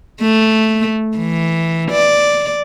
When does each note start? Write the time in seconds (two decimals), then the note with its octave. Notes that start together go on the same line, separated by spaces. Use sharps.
0.21 A3
1.17 E3
1.91 D5